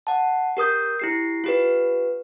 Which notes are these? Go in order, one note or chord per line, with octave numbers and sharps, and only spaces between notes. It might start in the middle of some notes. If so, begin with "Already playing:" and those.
F#5 A5
G4 A#4 D#6 G6
E4 G4 C7
F4 G4 B4